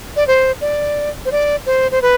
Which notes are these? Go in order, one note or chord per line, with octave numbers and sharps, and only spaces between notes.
D5
C5
D5
C5
D5
C5
C5
B4